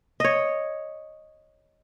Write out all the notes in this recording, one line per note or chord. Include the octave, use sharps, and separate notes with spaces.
C#5 D#5